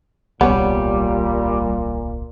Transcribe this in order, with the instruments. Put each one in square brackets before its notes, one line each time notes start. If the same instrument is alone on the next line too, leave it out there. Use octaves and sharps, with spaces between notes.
[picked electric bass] D1 B1 [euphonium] A#2 [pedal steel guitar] G3 [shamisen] B3 C#4